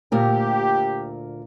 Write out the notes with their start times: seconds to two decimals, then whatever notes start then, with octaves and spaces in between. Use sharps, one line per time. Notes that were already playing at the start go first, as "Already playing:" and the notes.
0.12 D2 A#2 G4 A#4